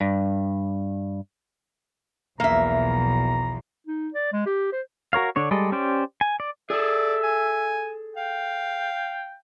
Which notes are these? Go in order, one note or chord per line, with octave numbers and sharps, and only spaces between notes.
G2
B1 E2 F3 A#3 E5 A#5
D#4
D5
G#3
G4
C5
F#4 A#4 C#5 F5
D3 D4 C#5
G3 G#3 A4 D5 D#5
C#4 G4 C5 D5
G#5
D5
G#4 A4 D5 E5
G#5
F5 G5